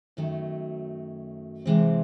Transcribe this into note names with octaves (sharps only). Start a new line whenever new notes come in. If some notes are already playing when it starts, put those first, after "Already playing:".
F#2 D#3 F#3 A3
C3 E3 G#3 C4